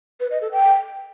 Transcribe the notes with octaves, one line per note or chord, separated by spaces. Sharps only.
B4
D#5
A4
G5